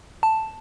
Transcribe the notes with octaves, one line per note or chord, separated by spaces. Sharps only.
A5